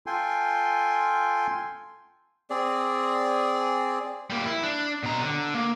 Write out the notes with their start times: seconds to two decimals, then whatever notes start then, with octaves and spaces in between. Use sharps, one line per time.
0.06 F4 A4 G5 G#5 C6
2.50 C4 G#4 D5
4.30 G3 A#3
4.45 E4
4.63 D4
5.03 B2 A#5
5.22 D3
5.54 A#3